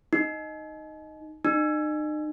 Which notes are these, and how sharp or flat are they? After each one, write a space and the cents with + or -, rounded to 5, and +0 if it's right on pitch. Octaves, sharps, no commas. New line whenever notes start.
D#4 +0
D#4 -40